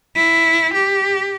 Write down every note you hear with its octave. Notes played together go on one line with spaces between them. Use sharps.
E4
G4